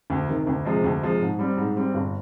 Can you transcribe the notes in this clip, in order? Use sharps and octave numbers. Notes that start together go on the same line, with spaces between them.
D2
C3 D#3
D2
C3 F3 G#3
D2
C3 F3 G#3
G#2
G3 C4
G#2
G3 C4
G1